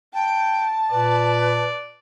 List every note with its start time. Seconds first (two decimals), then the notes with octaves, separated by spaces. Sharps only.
0.14 G5 A5
0.91 A#2 B4 D5